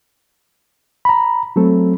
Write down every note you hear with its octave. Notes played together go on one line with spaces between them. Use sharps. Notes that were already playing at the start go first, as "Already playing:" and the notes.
A#5 B5
F#3 A3 C4 A4